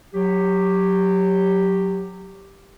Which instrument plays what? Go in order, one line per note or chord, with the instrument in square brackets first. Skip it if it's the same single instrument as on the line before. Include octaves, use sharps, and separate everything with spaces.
[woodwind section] F#3 G4